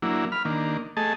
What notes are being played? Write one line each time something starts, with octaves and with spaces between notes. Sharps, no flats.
F#3 A#3 D4 E4
B5 F6
D#3 A#3 D4
A3 G#4 D#5 A5